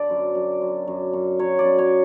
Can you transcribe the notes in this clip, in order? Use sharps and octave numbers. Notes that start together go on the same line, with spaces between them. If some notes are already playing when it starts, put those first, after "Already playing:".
Already playing: D3 D5
F#2
F#2
F#2
F#2
F#2
F#3 C#5
D5
F#2
C#5